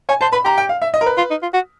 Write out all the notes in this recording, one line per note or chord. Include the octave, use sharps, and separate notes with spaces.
C#5 G#5
C5 A5
B4 B5
G4 A#5
G5
F5
E5
D#5
A#4
B4
F4
D#4
F4
F#4